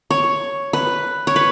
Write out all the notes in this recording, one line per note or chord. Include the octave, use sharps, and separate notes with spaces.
C#5
B4
C#5
B4